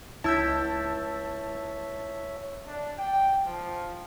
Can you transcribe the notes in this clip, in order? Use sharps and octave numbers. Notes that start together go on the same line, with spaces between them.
C#2 E4 C#5 E5 A5 E6 G6 B6
D4
G5
F3